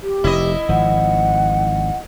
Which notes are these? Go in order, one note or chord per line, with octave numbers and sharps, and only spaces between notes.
G4
F1 E4 D#5
G#1 F3 F#5